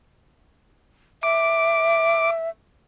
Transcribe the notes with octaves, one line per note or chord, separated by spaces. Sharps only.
E5 D6